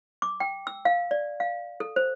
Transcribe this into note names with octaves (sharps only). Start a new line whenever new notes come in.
D6
G5
E6
F5
D5
F5
A4
C5